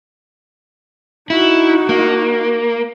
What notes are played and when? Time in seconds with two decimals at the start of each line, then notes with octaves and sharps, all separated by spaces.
1.30 D#4 E4 F#4
1.89 A#3